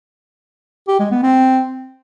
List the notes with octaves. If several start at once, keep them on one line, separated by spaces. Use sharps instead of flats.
G4
G#3
B3
C4